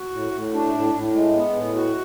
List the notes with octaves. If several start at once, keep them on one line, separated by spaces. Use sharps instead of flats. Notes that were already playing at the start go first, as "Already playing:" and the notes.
Already playing: F#4
A2
A2
D4
A2
A2
G#3
B3
A2
F#4